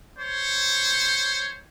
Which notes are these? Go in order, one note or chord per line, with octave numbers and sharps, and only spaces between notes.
C5 C#5